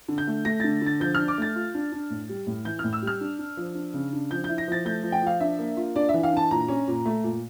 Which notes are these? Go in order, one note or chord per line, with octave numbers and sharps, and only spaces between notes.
D3
G6
A3
A3 A#6
D3 A6
D3 A6
F3 G6
D4 F6
D6
A3 A6
F4
D4
D4
A2
G3
A2
E3 G6
F6
A2
E6
G3
F6
D4
D4
F3
D4
C#3
D4
F3 G6
E4 G6
A#6
F3 A6
A3 G6
F3
G5
F3 F5
D4 E5
A#3
F4
D4 D5
E5
E3
F5
D4 A5
A#2 A#5
C#4
A#2
A3
A#2